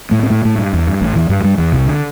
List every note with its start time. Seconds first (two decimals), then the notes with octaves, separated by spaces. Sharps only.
0.11 A2 A3
0.23 C4
0.30 A2 A3
0.45 A2 A3
0.58 G2
0.73 E2
0.87 G2
1.01 A1 A2
1.15 E2 E3
1.29 G2 G3
1.44 G2 G3
1.58 E2 E3
1.72 C2 C3
1.86 D3